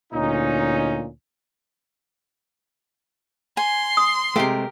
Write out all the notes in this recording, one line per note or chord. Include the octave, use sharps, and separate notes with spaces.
D2 A#2 C#4 D#4
G#5 C6
D#6
C3 G#3 A3 G4 A#4